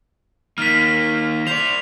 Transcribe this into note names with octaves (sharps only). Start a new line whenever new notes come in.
D#3 A#3 F6 B6
C5 D5 B6 F7